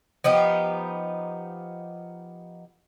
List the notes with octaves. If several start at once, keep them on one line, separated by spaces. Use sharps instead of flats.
F3 B3 D#4 G4